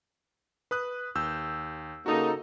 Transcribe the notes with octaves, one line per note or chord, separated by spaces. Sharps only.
B4 D#6 F#6
D#2 E6 G6
C#3 A#3 D#4 F#4 A4 D#5